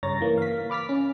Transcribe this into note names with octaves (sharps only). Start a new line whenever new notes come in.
G2 C#3 C#5 A#5 A6 A#6
E3 A#3
F5 B6
B5 D6 F6 A6 B6
C#4